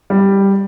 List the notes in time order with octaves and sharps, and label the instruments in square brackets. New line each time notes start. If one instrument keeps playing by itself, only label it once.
[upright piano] G3